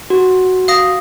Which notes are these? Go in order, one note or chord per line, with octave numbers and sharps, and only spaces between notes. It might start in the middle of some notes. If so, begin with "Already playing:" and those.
F#4
F5 D#6 A#6